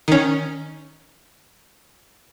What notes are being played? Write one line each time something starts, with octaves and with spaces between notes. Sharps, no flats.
D#3 C#4